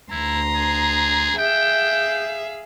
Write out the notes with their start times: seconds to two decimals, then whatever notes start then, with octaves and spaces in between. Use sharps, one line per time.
0.11 D2 E4 A#5 C6
0.55 G#4
1.38 G#4 E5 F5 G5